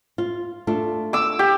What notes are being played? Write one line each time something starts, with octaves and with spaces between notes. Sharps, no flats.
F4
A3 D4 F4
D6 E6
G4